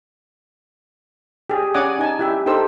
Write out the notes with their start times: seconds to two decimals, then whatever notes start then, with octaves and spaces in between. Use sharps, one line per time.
1.50 G4 G#4
1.74 C#4 D5 F#5 G#5 D6 D#6
1.99 D#4 G#5 A5
2.19 E4 G4 E5
2.46 D#4 G4 A4 C5 E6